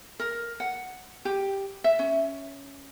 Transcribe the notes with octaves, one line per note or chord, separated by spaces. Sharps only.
A#4
F#5
G4
E5
C#4